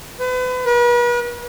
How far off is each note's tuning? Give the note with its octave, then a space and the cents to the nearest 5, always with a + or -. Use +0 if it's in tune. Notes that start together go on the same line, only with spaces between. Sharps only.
B4 +35
B4 -40